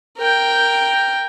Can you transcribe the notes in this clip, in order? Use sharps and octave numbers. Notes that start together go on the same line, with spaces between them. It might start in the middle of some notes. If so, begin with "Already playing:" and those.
A#4 G5